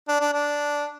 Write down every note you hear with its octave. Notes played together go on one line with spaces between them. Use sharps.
D4
D4
D4